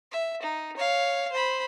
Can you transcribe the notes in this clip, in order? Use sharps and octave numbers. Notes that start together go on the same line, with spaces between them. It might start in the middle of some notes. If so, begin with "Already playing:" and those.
E5
D#4
C#5 F5
C5 B5